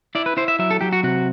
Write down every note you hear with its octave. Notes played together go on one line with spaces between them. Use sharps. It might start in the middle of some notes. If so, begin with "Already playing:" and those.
E4 D5
B4
E4 C5
E5
F#3 E5
A4
F#3 G4
F#4
C3 F#4